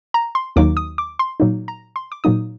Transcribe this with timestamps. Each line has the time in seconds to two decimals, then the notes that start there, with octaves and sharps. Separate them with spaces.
0.14 A#5
0.35 C6
0.56 D#2 D#3 F#3 A#3 D#4 D6
0.77 D#6
0.98 D6
1.19 C6
1.40 A#2 F#3 A#3 D#4
1.68 A#5
1.96 C6
2.12 D6
2.24 A#2 F#3 A#3 D#4 D#6